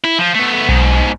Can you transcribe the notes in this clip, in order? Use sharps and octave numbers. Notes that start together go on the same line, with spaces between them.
E4
F3
A3 B3
B1 G#2 B2